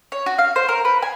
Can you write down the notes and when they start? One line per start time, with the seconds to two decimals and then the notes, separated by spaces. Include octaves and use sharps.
0.12 C#5
0.26 F#4
0.38 F5
0.56 C5
0.69 A#4
0.85 B4
1.02 G#5